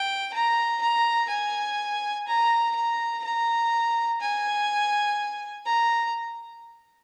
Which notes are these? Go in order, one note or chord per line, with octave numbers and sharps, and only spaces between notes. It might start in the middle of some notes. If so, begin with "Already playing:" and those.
Already playing: G5
A#5
A#5
G#5
A#5
A#5
A#5
G#5
A#5